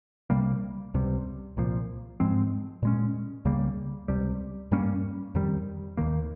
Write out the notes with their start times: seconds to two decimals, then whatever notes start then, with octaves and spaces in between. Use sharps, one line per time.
0.30 C2 C3 G3 A#3
0.94 C#2 C3 G3
1.57 C2 A#2 F3
2.20 G#2 F3 G#3 C4
2.83 A#2 G#3 C#4
3.45 C#2 C#3 G3 A#3
4.08 C#2 C3 G3
4.71 G2 G3 A#3 C#4
5.35 F2 D#3 G3
5.97 D#2 D#3 A#3